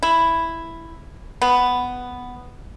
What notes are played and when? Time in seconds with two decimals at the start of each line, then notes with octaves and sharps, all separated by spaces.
0.03 E4
1.42 B3